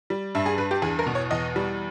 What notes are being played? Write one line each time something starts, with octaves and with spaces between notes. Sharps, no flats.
G3
G2 E5
G#4
G2 B4
G4
E2 G#4
A#4
B2
C#5
E2 D#5
G3